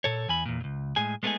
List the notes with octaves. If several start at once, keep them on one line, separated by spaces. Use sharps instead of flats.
A#2 A4 C#5
E2 G#5 B5
E2 A#2
C#2 G#2
A2 G#3 G#4 G#5
G#3 A3 B3 C#4 D#4 G#4